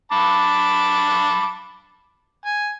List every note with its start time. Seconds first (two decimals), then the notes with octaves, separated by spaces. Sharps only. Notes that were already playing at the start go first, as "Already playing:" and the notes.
0.12 A5 B5 D6
2.46 G#5